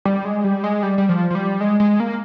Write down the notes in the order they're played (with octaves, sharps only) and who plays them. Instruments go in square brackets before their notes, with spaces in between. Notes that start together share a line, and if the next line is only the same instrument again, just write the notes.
[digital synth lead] G3
G#3
G3
G#3
G3
G3
F3
F3
G3
G#3
G#3
A#3